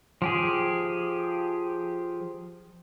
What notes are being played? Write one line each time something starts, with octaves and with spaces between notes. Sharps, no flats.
F3 G4 G#4